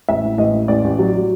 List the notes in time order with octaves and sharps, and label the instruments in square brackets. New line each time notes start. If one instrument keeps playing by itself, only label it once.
[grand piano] A1 E5
A2
A1 D#5
A2
A1 D5
A1
F#3
F#3